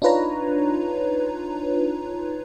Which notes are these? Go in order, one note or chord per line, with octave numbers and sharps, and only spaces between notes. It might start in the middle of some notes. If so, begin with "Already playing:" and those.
D4 D#4 F4 B4 C#5 A#5